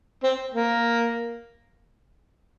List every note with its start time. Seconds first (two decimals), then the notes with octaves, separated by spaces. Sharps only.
0.23 C4
0.54 A#3